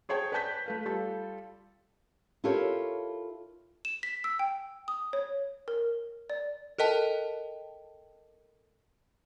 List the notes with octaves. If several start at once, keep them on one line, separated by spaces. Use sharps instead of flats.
G#4 C5 C#5 G5 A5
B4 D5 G5 A5 G6 B6
A3 B4 F5
G3 F4 A4
E4 F4 G4 A4 A#4 C#5
E7
B6
E6
G5
D#6
C#5
A#4
D5
A4 A#4 D#5 G5 A5